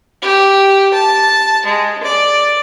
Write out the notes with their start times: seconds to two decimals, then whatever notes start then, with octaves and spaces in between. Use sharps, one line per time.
0.22 G4
0.94 A5
1.66 G#3
2.03 D5